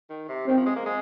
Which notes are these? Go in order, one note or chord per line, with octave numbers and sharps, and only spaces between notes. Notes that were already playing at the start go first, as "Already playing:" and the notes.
D#3
C3
D#3 C4
F3
G#3
A#3
G#3